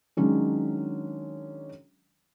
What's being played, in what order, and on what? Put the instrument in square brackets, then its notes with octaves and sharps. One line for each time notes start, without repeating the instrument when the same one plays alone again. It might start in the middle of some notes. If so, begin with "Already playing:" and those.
[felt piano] D#3 F#3 G#3 C#4 D4